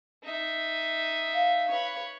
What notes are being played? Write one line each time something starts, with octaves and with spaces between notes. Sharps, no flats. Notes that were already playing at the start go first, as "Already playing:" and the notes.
D#4 E5
F5
B4 C#5